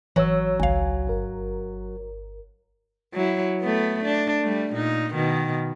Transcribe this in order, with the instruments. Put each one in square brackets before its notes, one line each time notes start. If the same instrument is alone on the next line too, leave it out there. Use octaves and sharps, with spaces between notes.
[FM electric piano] G#1 C#5 E6 [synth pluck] E3 [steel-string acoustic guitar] F#3
[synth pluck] G#1 F5 [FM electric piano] C#2 G#5
[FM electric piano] G1 A#4
[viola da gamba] F#3 E4
A3 B3
D4
G3 A3
A#2 D#4
B2 D#3